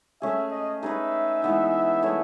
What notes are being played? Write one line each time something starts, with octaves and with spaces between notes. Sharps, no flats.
A3 C#4 G#4 E5
D#5
A3 D#4 G#4 B4 E5
E3 G#3 B3 D#4
A3 E4 G#4 C#5